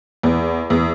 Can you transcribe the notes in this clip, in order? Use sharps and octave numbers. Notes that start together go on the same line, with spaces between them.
E2
E2